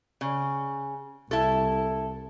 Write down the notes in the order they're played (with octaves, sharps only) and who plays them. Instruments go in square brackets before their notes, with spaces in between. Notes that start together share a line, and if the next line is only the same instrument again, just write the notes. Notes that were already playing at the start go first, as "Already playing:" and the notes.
[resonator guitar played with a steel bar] C#3
[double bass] C2 [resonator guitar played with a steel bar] E4 A4